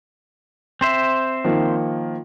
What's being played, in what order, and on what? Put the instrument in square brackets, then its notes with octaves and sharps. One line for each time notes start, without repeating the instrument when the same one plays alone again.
[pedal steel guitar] C4 C5 E5
[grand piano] D#3 F3 A#3